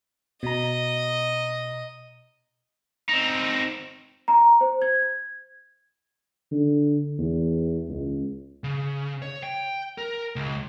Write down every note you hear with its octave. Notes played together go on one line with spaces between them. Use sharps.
B2 D#5 A#5
C4 D#4
A#5
C5
G#6
D3
E2
C#2
C#3
C#5
G5
A#4
C#2